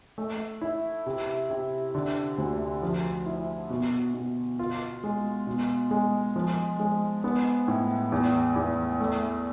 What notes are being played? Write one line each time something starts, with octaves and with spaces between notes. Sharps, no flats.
A3
E4
C3
C3
D3
D2
F3
E4
B2
B2
F4
G#3
B2
G#3
F3
G#3
B3
A2
E2
E2
A3